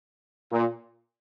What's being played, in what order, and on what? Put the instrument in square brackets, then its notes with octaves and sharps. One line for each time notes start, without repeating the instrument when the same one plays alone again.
[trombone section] A#2